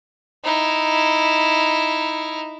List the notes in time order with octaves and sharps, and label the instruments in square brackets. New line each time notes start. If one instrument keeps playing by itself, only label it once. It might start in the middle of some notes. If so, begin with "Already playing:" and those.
[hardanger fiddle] D#4 E4